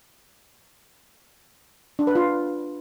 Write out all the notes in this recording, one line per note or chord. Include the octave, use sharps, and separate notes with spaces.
D4
B4
F4